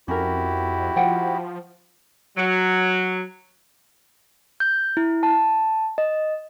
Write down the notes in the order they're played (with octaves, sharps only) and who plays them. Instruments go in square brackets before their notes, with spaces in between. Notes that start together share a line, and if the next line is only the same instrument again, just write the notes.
[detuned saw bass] F2 [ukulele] C#4 A#4 [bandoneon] E4 F#4 G4
[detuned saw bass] F3 [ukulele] F4 F#5 G5
[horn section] F#3
[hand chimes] G6
E4
A5
D#5